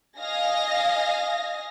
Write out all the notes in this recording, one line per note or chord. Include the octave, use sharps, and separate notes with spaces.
D#5 F5 G#5 A#6